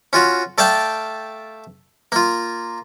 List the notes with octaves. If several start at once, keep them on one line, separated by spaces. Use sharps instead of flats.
C#4 F4 F#4
A3 D5 F5 G5 A5
A#3 F4